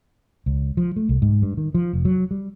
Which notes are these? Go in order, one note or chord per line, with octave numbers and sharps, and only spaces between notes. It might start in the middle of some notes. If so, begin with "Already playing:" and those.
C#2
F3
A3
C2
G#2
G2
D#3
F3
F1
F#3
G3